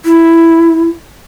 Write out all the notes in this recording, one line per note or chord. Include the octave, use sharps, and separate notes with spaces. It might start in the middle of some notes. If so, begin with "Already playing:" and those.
E4